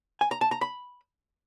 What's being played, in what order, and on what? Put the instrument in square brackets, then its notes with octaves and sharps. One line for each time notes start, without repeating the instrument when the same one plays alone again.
[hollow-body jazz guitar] G#5
A#5
A5
A#5
B5